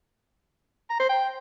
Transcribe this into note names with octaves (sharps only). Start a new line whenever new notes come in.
A#5
C5
G5